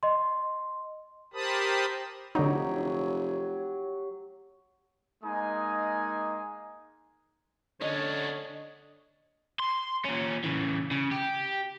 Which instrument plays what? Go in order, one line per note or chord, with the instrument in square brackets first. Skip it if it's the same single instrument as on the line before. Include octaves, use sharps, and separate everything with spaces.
[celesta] D#5 C6
[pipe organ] G4 A#4 C5 A5 B5 D#6
[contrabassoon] F1 [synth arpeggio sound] D3 D#4 [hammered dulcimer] F#3 G4 [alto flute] C#5
[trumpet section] G#3 A#3 D#4 G#5 D#6
[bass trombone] D3 [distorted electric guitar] C#4 D4 [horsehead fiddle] C#5 [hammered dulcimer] D#5
[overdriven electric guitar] C6
A#2 C#4
C#3 E3
C#3
G4